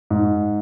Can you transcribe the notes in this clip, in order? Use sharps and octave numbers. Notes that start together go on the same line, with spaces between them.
G#2